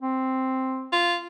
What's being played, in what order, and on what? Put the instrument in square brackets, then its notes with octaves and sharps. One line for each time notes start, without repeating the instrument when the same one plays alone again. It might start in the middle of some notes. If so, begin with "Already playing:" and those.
[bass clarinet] C4
[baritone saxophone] F4